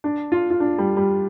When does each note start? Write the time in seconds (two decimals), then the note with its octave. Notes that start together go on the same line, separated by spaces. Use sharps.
0.04 D4
0.32 F4
0.50 F4
0.60 D4
0.78 G3
0.97 G3